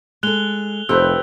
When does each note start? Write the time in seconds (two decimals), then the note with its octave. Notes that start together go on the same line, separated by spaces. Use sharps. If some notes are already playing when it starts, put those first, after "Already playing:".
0.23 G#3 A4 F#6 F7 G7
0.89 F1 C4 G4 A4 B4 G5 E6 F#6